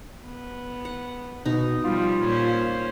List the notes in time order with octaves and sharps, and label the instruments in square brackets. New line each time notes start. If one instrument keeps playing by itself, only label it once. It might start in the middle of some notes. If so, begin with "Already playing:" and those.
[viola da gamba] B3
[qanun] F#5
[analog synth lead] B2 [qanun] D#4
[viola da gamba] F3 G3 [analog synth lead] F4
[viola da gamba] A#2 C#4 C5